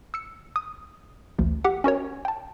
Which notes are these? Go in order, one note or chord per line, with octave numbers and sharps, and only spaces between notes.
E6 C#7
D#6
A1 D2
G4 F#5
C#4 F#4 A#4 C#5
G5 A5